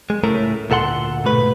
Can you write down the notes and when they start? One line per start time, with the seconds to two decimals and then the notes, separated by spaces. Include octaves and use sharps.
0.10 G#3
0.24 C#2 A2 A3 C#4 A#4
0.70 D2 A#2 A4 F#5 C6
1.24 G#2 B2 A3 B4